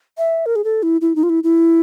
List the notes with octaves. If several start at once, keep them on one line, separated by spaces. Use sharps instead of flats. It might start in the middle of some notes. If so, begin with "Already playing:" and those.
E5
A#4
G#4
A4
E4
E4
D#4
F4
E4
E4